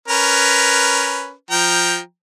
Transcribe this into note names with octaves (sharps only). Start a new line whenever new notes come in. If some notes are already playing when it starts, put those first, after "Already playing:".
C#4 A#4 B4
F3 G5 A#5